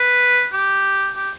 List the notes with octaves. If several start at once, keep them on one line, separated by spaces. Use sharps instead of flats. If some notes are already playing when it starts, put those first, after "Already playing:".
Already playing: B4
G4
G4